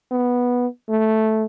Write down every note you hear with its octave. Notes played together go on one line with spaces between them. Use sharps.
B3
A3